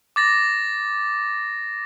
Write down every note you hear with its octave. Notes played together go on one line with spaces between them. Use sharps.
D6 A6 A#6